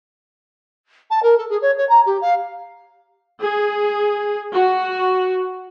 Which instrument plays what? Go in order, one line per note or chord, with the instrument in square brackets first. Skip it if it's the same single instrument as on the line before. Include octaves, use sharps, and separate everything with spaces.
[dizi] A5
A#4
A4
G#4
C#5
C#5
A#5
G4
F5
[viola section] G#4
F#4